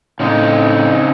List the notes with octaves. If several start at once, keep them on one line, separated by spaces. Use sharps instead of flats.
A2 C#3 C4 D#4